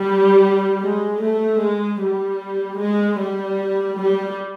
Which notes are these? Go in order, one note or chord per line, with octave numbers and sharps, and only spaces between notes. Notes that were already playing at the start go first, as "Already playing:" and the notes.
Already playing: G3
G#3
A3
G#3
G3
G#3
G3
G3